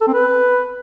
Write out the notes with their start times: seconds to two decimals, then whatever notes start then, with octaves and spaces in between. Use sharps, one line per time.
0.01 A4
0.07 C4
0.14 B4